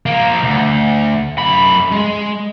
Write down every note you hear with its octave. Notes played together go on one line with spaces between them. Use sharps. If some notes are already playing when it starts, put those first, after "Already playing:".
F3 A#3
D2
F#2 B5
G#3